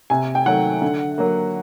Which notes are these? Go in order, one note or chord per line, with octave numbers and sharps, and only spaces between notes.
C3 G#5
G5
D#3 F#3 A3 F#5
D3
F#3 A#3